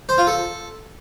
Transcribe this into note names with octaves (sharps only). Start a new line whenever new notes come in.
C5
F4
A4